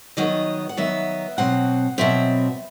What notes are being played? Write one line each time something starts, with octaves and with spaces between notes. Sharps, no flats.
D#3 F#3 B3 D#5
F#5
D#3 F#3 B3 E5
B2 F#3 C4 F#5
B2 F#3 C4 E5